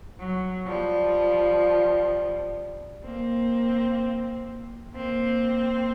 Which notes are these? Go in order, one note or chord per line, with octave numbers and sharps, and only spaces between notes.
F#3
F3 G3
A#3 C4
A#3 C4